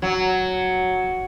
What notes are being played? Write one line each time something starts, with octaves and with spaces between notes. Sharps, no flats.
F#3